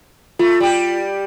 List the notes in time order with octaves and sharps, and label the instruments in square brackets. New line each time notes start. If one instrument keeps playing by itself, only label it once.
[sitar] A3 [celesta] F4
[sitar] G3 G4